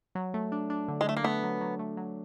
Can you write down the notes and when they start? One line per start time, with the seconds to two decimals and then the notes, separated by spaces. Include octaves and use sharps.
0.15 F#3
0.34 A3
0.52 D4
0.70 D4
0.88 D3
1.01 G#3
1.07 D3 A3
1.17 A#3
1.24 A3 B3
1.43 F#3
1.61 F#3
1.79 A3
1.97 F#3